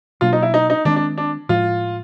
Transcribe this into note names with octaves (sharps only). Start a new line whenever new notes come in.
B2 F#3 A#3 D4 F4
D#4
E4
D#4
D#4
D#3 G#3 C4 D4
D4
D4
A2 F3 G#3 F4